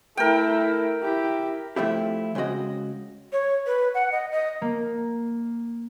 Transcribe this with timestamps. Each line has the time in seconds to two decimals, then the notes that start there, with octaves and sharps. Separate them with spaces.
0.17 A3 E4 A#4 G5
1.02 E4 G4
1.76 F3 A3 C4 E4 G4
2.35 C#3 G#3 C4 F#4 D#5
3.32 C#5
3.66 B4
3.94 F#5
4.12 D#5
4.32 D#5
4.62 A#3